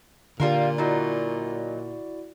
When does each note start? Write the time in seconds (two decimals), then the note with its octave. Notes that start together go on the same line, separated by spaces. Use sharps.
0.40 A#2 D3 G3 F4 A#4
0.78 F#3 D#4 E4 F#4 D5